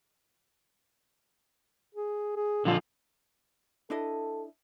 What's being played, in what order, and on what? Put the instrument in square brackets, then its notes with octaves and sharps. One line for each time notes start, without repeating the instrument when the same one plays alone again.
[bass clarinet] G#4
G#4
[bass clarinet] A#2 [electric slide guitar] D3 F3 F4
[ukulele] D4 E4 D#5 [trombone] A4